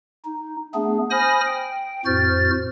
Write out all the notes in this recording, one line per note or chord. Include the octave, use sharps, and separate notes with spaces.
D#4
A3 B3 D4 G#4
C5 G#5 B5 D#6 F6 A#6
G5
F2 A2 F#4 C5 F6 A6